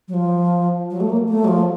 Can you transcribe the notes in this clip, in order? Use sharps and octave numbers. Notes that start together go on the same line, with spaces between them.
F#3
F3
F#3
A3
A#3
A3
F#3
F3